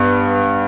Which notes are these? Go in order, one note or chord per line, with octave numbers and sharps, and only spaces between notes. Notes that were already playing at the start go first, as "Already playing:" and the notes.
Already playing: G2 B3